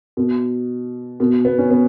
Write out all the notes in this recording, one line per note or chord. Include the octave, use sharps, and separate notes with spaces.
B2
B2
B3
C#4
B3